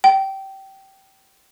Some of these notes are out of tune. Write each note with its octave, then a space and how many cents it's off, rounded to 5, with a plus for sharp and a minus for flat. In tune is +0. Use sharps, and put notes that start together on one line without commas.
G5 -20